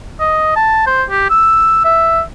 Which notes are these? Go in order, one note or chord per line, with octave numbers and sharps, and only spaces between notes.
D#5
A5
C5
G4
E6
E5